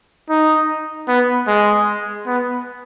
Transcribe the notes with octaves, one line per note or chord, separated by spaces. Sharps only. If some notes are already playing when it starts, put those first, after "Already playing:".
D#4
B3
G#3
B3